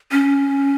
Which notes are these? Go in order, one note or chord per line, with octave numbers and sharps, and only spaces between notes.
C#4